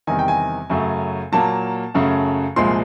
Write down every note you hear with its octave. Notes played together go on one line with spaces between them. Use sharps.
E2 C3 D#3 G3 G#5
G5
G#5
F#2 C#3 F#3 A3
A#2 F#3 A#3 A5
F#2 C#3 F#3 A3
C2 A#2 F3 G#3 C6